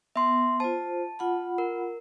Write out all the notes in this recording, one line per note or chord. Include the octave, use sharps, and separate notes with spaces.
B3 E5 C6
F4 C5 A5
F4 F#5 B5
A#4